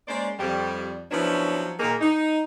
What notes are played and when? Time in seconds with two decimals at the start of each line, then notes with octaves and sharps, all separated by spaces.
0.08 G#3 A#3 C#4 C5 D5
0.39 F2 G3
1.11 F3 F#3 B3 C#4 D4 E4
1.80 A#2 D#3 A#3 D#4 G#4 A#4
2.01 D#4